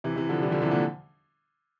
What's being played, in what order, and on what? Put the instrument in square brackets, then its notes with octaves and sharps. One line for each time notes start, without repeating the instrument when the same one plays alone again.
[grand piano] C3 E3
C3 E3
D3 F3
E3 G3
D3 F3
C3 E3
A#2 D3